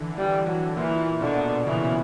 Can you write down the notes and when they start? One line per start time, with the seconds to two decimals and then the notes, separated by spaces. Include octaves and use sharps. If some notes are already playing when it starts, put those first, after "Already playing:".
Already playing: D3 E3
0.17 G3
0.48 F#3
0.77 A#2 E3
1.21 B2 D3
1.67 C#3 E3